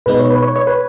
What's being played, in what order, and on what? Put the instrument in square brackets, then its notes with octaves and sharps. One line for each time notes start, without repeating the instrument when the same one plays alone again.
[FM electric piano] B2 G#3 B3 D#4 B4
C#5
B4
C#5
C#5
B4